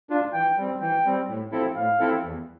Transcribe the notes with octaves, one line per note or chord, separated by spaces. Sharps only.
D4 F4
E3 G5
G3 C4
E3 G5
G3 C4
A2
F3 C4 E4 A4
A2 F5
F3 C4 E4 A4
E2